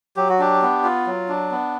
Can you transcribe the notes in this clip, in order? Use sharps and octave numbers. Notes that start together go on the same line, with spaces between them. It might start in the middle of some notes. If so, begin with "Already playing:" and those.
F#3 G4
F#4
D4 G4
B3
F4
F#3
D4
B3